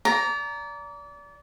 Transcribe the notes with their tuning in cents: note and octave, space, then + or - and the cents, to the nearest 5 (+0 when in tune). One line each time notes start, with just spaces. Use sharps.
D5 -30 A#5 +0